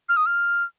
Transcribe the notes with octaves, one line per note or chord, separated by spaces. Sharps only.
F6
D#6
F6